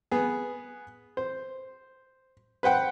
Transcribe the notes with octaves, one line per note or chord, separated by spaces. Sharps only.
B3 G#4
C5
B4 C5 F#5 G5